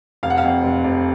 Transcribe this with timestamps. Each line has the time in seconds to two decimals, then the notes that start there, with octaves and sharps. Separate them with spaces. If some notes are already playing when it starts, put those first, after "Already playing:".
0.23 F1 F5
0.30 F#5
0.38 F5
0.43 F2
0.63 F1
0.84 F1